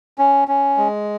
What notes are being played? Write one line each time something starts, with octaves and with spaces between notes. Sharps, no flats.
C#4
C#4
G#3